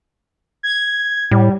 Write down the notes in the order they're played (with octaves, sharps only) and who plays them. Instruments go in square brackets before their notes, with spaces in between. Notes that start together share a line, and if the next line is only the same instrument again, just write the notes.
[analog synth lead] G#6
[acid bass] A2 [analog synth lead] G3